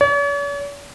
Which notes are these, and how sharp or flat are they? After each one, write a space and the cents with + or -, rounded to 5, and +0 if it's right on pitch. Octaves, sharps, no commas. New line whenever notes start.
C#5 +45